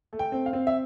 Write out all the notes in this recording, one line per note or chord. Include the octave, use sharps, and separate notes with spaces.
A3
G5
C4
F5
C4
E5